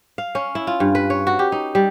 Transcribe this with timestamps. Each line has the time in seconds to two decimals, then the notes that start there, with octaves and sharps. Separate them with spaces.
0.18 F5
0.35 C#4
0.55 E4
0.67 F4
0.80 G2
0.95 B4
1.10 C#5
1.27 F#4
1.39 G4
1.52 D#4
1.75 G3